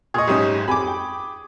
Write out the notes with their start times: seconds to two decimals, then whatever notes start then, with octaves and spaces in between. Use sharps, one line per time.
0.14 A#2 G#4 D#5 C#6
0.27 F#1 G#2 C#4 G4 D#5 D#6
0.68 F2 G4 G#5 B5 D6
0.87 G5